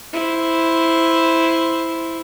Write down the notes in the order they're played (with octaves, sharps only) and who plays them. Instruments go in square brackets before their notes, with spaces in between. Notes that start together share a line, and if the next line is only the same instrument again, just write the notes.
[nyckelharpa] E4 C5